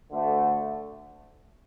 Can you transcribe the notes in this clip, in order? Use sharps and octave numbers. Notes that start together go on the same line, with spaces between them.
D2 D3 A3